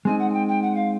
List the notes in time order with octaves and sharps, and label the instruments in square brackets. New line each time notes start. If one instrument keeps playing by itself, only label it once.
[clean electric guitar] G#3 C4 D#4 [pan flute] G#5
[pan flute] F#5
G#5
G5
G5
F#5
F5